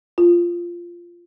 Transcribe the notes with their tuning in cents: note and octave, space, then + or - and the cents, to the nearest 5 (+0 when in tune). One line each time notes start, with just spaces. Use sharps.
F4 -10